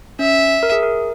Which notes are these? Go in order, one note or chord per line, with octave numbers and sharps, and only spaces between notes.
C#4 E5
A#4
G#4
A#4